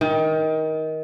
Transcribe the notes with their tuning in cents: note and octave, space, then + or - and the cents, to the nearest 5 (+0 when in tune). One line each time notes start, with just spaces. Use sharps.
D#3 +20